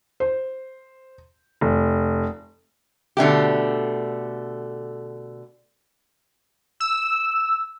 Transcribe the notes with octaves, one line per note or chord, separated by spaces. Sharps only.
C5
F1
B2 D3 A3 G4
E6